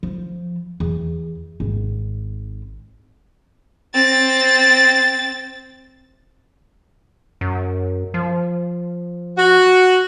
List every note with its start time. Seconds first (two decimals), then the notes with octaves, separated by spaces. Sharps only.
0.03 F3
0.80 E2
1.60 G#1
3.94 C4 A6
7.41 F#2
8.14 F3
9.37 F#4